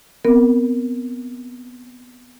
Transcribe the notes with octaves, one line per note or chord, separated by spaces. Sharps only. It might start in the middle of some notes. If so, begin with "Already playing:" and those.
B3 C4 A#4